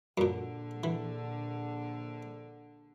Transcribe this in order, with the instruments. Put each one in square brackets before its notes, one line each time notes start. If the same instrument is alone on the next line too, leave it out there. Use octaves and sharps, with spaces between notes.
[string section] A#1 D3 [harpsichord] F#2 A#2
[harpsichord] E3